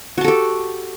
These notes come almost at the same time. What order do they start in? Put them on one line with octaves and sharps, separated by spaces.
F#4 A5 A4 G4